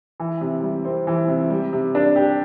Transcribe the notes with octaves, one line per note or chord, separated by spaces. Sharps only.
E3
C3
G3
C4
E3
C3
G3
C3
D4
G4